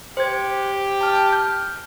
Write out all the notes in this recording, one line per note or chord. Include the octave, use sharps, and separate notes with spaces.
G4 C5 G#6
A5 F6
F6 G6